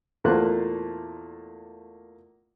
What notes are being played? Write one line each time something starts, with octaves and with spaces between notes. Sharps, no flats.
E2 A#2 A3 A#3 C5 F#6